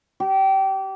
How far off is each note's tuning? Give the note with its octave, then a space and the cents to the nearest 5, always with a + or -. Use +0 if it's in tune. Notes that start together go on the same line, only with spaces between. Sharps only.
G4 -25